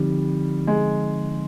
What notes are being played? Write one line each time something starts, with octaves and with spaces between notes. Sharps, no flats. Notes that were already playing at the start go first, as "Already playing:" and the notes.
Already playing: D3 F3 G3 C4 D#4
G#3